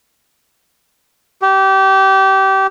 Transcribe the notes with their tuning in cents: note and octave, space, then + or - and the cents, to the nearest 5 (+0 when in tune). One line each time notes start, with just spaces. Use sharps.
G4 -25